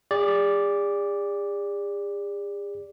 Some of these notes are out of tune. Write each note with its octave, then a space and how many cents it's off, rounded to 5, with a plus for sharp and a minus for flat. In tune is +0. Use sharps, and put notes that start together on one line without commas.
G#4 -45 D5 -5